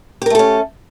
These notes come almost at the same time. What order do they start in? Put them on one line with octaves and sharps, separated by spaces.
G4 A#4 A3 A4 C#4